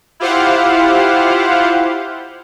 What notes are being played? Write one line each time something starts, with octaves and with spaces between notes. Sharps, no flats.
E4 F4 G4 C5 F5 F#5